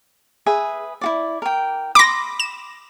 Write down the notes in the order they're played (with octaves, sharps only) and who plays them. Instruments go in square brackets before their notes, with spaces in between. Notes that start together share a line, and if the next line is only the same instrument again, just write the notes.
[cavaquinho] G#4 B4 E5
E4 F#4 D5
A#4 G5
[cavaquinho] B5 C6 [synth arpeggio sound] D6 A#6
[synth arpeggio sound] E7